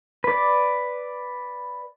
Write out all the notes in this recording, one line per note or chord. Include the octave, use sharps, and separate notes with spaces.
B4 D5